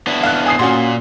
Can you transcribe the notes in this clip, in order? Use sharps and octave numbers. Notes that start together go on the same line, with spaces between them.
B3 D4 E4
F5 F#6
G#5 D#6 C7
A#2 C#4 F#4 C6